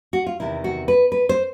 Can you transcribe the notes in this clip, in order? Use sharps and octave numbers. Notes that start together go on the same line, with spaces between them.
F#4
F4
E2 C3 D#3 E4
F#4
B4
B4
C5